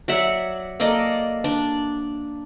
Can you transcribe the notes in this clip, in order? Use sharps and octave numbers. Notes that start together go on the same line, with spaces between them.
F#3 D5 E5 F#5
A#3 A4 D5 D#5
D4 D5